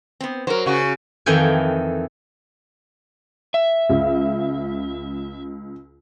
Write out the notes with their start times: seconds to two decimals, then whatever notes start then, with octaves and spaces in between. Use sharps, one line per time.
0.21 B3 C4
0.47 F#3 A#4 C5
0.66 C#3 F#4
1.26 F2 D#3 E3 A4 G5 G#5
3.54 E5
3.89 C#2